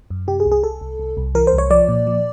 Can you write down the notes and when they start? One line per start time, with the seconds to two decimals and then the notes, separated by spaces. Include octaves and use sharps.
0.10 F#2
0.27 C3 G4
0.40 G#4
0.46 C2
0.52 G#4
0.63 C2 A4
0.81 C2
1.00 C2
1.17 C2
1.35 E3 A#4
1.47 C5
1.53 C2
1.58 C#5
1.71 F3 D5
1.88 A#2
2.07 F3